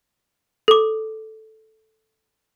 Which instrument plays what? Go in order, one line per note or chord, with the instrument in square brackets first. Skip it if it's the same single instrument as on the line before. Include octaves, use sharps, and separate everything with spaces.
[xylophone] A4 D6